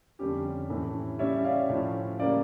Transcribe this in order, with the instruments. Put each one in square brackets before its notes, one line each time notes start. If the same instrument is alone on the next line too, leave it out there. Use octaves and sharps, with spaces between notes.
[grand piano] F2 D3 G3 C#4 G4
A2 E3 A3 C#4
C#3 G3 C#4 C#5 E5
D5 F5
A2 F3 C#4
C#3 G3 A#3 C#4 D5 F5